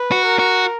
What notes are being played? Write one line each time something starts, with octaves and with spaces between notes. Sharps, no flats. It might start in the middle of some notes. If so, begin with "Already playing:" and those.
Already playing: B4
F#4
A#4
F#4